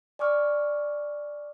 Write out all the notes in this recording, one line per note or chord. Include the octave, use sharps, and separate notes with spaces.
D5 G#5 C#6 D6 F6